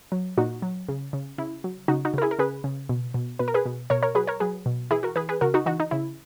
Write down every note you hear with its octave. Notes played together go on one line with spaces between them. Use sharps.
F#3
A#2 D#4 F#4
F#3
C#3
C#3
C#3 E4
F#3
C#3 D#4 F#4
D#4 F#4
C#3 A#4
E4 G#4
A#4
C#3 G#4 B4
C#3
B2
B2
B2 B4
A#4
G#4 B4
B2
B2 A#4 C#5
A#4 C#5
F#3 G#4 B4
A#4 C#5
F#3 G#4 B4
B2
E3 E4 G#4
F#4 A#4
E3 G#4 B4
G#4 B4
C#3 F#4 A#4
D#4 F#4
E3 D#4 F#4
D#4
C#3 E4